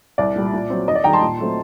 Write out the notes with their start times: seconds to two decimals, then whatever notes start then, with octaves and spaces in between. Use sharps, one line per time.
0.18 C2 D5
0.36 A#2 G3
0.53 A#2
0.70 F#3 C4
0.88 D#2 D#5
0.95 D5
1.04 D#3 G3 G5 A#5
1.13 A5 C6
1.21 A#2
1.40 F#3 A3 C4